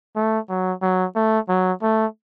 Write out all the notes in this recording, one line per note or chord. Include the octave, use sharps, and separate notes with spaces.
A3
F#3
F#3
A3
F#3
A3